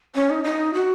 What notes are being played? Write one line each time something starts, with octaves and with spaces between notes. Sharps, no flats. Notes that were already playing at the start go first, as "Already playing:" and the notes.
C#4
D#4
D#4
F#4